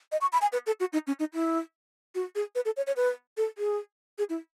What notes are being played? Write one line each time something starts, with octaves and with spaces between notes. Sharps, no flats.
D#5
C#6
B5
G#5
B4
A4
F#4
D#4
C#4
D#4
E4
F#4
G#4
B4
A4
C#5
C#5
B4
A4
G#4
G#4
E4